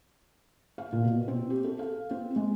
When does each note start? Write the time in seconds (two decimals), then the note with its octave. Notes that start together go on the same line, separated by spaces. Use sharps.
0.78 F5
0.92 A#2
1.04 B2
1.28 C4
1.50 G4
1.64 A4
1.79 F5
2.11 C4
2.36 G#3